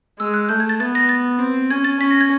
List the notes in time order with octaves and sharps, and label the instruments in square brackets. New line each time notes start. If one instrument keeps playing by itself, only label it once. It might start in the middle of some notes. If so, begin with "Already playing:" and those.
[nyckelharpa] G#3 [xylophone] E6
[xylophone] F#6
[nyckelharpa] A3 [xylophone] G6
[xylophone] G#6
A6
[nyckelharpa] B3 [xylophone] A6
[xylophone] A#6
A6
[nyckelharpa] C4
[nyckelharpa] C#4 [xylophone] G#6
[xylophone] A6
[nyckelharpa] C#4 [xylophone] B6
[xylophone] A#6
G#6